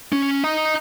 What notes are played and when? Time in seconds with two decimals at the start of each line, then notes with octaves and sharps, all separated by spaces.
0.12 C#4
0.44 D#5 A#5